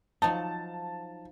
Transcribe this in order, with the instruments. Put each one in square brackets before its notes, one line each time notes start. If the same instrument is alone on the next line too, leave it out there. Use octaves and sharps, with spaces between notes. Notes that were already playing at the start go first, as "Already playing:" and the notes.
[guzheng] F3 F#3 D#4 [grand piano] A5